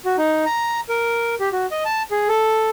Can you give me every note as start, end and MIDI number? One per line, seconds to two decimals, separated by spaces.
0.05 0.16 66
0.18 0.45 63
0.46 0.81 82
0.89 1.35 70
1.40 1.49 67
1.52 1.66 66
1.71 1.84 75
1.85 2.03 81
2.11 2.28 68
2.29 2.70 69